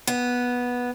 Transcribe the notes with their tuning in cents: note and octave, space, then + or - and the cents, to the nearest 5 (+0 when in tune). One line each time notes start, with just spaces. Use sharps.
B3 -10